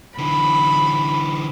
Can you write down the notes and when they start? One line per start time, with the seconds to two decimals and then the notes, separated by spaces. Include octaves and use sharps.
0.18 D3 E3 B5